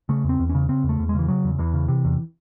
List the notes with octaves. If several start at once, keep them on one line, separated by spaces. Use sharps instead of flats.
C#3 A3
E2
C4
E2
C#4
C#3
C#3 C4
E2
A3
E2
G#3
C#3 E3
C#3 F#3
E2
E2 E3
C#3
C3
E2